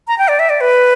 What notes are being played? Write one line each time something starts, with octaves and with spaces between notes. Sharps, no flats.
A#5
G5
D5
E5
D5
B4